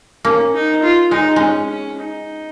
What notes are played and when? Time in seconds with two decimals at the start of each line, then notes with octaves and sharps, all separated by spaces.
0.25 A#3 C#4
0.54 D#4
0.83 F4
1.11 G#3 D#4
1.36 G#3 C#4
1.69 C#4
1.98 D#4